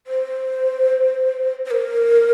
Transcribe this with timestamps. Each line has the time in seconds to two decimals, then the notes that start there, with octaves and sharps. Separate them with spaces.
0.07 C5
1.65 C5
1.71 A#4